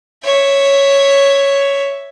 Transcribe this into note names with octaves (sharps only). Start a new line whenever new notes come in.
C#5 E5